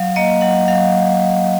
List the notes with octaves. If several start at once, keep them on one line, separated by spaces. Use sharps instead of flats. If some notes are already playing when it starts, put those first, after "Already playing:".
Already playing: F#3 F5
A#3 D#5
F#3 F#5
F#3 F5